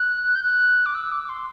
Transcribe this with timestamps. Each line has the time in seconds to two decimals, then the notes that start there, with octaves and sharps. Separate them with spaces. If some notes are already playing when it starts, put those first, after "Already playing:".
Already playing: F#6
0.35 G6
0.43 F#6
0.86 D6
0.94 E6
1.11 D6
1.24 D6
1.29 C6